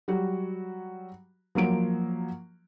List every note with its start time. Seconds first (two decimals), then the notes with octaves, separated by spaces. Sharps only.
0.08 F#3 G3 F#4
1.55 F3 F#3 A#3 D7